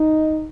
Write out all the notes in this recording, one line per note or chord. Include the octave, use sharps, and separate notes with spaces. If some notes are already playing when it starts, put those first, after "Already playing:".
Already playing: D#4